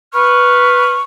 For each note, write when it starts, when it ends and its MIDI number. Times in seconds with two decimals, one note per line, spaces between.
0.14 0.97 71
0.14 1.02 85
0.14 0.97 89